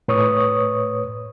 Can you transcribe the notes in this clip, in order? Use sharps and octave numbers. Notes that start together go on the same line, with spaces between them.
A2 B4 C#5 C#6 D#6